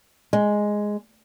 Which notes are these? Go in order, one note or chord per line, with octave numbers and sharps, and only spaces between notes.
G#3